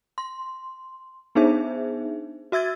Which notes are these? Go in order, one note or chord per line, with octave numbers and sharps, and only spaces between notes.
C6
B3 D4 D#4 G#4 C5 E5
F#4 E5 E6 G#6 A6